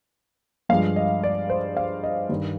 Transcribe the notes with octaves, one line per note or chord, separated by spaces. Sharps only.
G2 F3 G#3 F5
D#5
D5
C5
F5
D#5
G2 D#3 G3